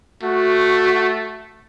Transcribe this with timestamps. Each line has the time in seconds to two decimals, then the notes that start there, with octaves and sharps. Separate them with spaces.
0.23 A3 F#4